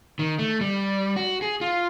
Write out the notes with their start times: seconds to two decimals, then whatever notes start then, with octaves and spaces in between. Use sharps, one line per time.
0.19 D#3
0.39 A3
0.61 G3
1.16 F#4
1.42 G#4
1.61 F4